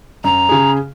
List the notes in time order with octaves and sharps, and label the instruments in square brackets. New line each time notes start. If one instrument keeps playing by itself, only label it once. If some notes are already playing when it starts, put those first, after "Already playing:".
[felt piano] F#2 [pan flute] A#5
[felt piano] C#3 G#4